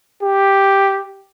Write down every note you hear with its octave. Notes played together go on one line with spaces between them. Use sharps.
G4